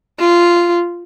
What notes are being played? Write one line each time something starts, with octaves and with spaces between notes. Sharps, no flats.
F4